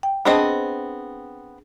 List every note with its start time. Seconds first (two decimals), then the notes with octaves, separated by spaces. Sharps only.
0.03 G5
0.25 B3 C4 D4 G#4 D#5 A5